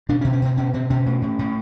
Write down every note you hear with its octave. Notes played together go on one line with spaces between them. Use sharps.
B2 D4
C#4
B2
C#4
B2 C4
B2 C#4
B2 C4
B2 C#4
A2
A2
A2